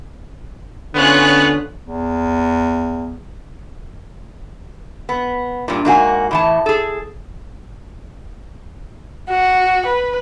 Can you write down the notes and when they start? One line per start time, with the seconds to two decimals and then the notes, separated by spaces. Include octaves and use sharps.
0.95 D3 B3 C#4 F4 F#6
1.84 E2
5.09 B3
5.68 G2 A#2
5.85 G#2 A#3 F#4 G#5
6.31 A2 E3 A5
6.66 G#4 A4
9.30 F#4
9.86 B4